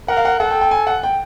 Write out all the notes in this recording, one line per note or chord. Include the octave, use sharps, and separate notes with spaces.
A#4 F#5
F5
F#5
A4 F#5
G5
G5
G#5
F#5
G5